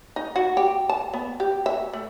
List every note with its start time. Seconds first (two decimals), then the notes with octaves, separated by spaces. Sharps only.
0.16 D#4
0.36 F#4
0.57 G4
0.89 A5
1.14 B3
1.40 G4
1.66 E5
1.93 A3